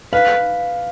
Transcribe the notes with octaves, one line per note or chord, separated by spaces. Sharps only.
B4 F5